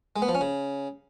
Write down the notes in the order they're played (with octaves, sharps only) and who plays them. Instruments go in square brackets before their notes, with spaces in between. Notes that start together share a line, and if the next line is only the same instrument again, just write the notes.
[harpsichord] G#3
B3
F3
C#4
C#3